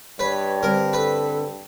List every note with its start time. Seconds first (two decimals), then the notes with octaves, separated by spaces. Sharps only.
0.19 G2 B4 C#5
0.63 D3 G3 C4 A#4
0.93 A4 B4